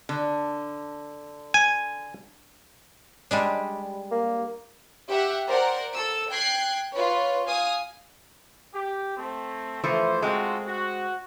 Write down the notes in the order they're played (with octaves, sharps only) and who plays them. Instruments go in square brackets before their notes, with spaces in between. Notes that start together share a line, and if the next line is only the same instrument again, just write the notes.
[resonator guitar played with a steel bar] D3
[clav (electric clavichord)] G#5
[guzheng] G3 G#3 D4
[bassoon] A#3
[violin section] G4 E5 F#5
A#4 C5 D5 F#5
A4 E6
G5 F#6 G#6 C7
F4 B4 C#5
F5 G#5 D#6
[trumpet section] G4
A3 C4
[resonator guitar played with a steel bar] E3 F3 A3 [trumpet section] C5
[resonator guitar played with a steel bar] G#3 C4 [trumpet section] F4 F#4 A4
[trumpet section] F#4